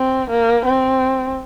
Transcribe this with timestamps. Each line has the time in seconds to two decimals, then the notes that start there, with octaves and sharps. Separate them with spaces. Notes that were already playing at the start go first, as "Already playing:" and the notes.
Already playing: C4
0.30 A#3
0.66 C4